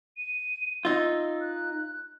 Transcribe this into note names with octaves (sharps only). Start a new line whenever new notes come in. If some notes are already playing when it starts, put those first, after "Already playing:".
D#7
D#4 F4 E6
F#6